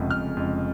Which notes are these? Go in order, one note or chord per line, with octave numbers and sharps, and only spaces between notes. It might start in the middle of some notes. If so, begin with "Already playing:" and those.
Already playing: F1 F2 C#3 G#3
F1 F6
F2 C#3 G#3